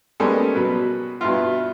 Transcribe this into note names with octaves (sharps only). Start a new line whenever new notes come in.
G3 G#3 A#3 B3 C#4 A4
B2 F#3 B4
G2 B2 B3 E4 F4